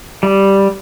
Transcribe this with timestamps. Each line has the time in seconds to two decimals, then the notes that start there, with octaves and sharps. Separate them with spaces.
0.23 G3